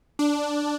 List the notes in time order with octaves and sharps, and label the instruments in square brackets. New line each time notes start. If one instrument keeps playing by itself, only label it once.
[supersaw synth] D4